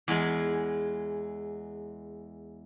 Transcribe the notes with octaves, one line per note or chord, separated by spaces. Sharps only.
E2 G#3